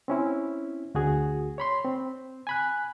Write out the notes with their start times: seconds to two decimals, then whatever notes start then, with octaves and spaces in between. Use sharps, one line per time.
0.08 C4 C#4 E4
0.95 D2 F#4 G#4
1.58 C#5 B5 C6
1.84 C4
2.47 G#5 B5 F#6